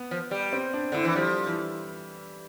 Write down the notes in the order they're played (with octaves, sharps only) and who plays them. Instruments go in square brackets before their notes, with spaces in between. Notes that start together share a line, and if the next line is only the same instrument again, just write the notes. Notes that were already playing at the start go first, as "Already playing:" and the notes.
Already playing: [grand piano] B3
[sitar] F3
G3
[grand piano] C4
D4
[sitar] D3 [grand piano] E4
[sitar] E3
[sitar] F3 [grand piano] G3
[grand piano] E3